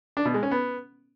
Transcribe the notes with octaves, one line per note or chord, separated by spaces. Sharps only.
D4
B2
G#3
C#4
B3